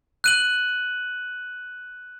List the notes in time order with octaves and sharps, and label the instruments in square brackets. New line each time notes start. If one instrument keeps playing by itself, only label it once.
[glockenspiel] F#6 D#7 F#7